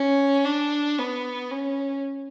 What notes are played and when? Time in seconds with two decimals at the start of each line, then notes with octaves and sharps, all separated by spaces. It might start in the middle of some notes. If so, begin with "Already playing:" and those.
Already playing: C#4
0.45 D4
0.98 B3
1.51 C#4